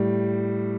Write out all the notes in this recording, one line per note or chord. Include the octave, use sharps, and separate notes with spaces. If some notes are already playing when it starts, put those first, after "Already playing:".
Already playing: A2 G3